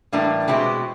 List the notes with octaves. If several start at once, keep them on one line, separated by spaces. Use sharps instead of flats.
A2 E3 G3 A#3 D4
B2 G#3 C4 E4 G4